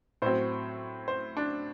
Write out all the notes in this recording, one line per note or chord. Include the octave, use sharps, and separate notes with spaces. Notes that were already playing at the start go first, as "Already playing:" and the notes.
A2 F#3 C4 C5
C5
D4